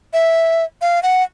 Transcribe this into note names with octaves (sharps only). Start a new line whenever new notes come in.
E5
F5
F#5